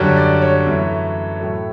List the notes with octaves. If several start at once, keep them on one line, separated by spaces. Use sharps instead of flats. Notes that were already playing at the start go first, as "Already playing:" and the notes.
Already playing: F#2 D3 G3 C#5
D5
C#5
F#2 E3 A3
A2 F#3 A3